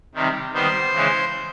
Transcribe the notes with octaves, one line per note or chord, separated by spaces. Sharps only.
C3 D#3 G3
D#3 G3 B3 C5
C#3 E3 G#3 C#4